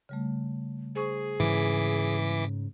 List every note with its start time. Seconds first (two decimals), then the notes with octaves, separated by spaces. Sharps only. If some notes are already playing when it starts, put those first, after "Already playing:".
0.09 C#3 G3 A3
0.95 G#4 C5 C#6
1.40 G#2 C#3 E3 D6 B6